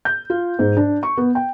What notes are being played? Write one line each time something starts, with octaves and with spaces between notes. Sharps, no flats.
G6
F4
G#2
D4
C#6
B3
G5